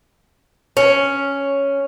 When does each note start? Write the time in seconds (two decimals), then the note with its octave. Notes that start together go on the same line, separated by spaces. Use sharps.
0.77 C#4